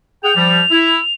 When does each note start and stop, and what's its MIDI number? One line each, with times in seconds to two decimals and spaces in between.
0.24 0.32 68
0.24 0.32 78
0.24 0.32 79
0.24 1.14 101
0.36 0.61 53
0.36 0.61 55
0.71 0.98 64